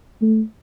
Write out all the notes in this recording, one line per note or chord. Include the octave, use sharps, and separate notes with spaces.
A3